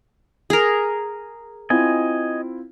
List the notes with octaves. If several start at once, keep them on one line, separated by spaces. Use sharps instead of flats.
G#4 A#4
C4 E4 F4 D#5 G#5